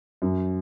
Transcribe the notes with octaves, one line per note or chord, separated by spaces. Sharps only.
F#2